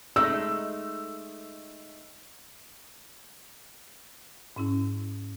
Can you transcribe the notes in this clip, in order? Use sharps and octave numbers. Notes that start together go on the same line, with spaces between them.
G#3 A3 D#4 E6
G#2 C#4 E4